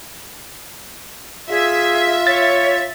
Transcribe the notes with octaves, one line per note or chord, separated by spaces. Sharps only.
F4 G#4 E5
C#5 A6